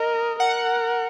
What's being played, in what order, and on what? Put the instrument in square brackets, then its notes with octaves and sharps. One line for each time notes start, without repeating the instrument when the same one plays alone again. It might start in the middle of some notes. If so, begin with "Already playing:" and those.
Already playing: [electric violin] A#4 [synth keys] D#5
[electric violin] A#4 [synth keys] F#5